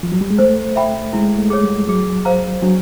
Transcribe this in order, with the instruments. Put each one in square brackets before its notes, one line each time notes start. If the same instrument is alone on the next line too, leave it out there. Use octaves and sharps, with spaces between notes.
[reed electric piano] F3
F#3
G3
G#3
[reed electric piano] A3 [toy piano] C5
[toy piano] E5 G5 B5
[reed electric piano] G#3 [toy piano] E4
[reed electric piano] A3
[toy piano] G#4 C#5
[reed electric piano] G3
[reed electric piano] F#3 [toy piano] G#4
[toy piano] C5 F5 A#5
[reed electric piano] F#3 [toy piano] D4